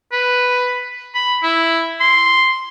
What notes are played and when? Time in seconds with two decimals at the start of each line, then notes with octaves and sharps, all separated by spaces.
0.13 B4
1.15 B5
1.43 E4
2.01 C6